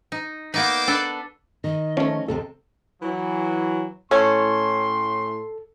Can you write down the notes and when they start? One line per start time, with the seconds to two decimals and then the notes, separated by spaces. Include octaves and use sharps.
0.12 D#4
0.54 A#3 B3 D#4 C5 D5 D6
0.88 D4 A4 B4
1.64 D#3 D#5
1.97 F3 A3 C#4
2.28 D#2 C3 C4 A4
3.02 E3 F#3
4.11 A2 A3 C#4 A4 C6